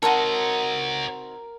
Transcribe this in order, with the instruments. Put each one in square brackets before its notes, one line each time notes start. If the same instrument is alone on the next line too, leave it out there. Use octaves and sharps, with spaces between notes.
[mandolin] C4 D#4 F#4 [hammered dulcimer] A#4 [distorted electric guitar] C#5 D#5 [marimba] A5